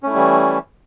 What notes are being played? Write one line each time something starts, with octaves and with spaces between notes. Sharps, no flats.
E3 G3 A3 C#4 E4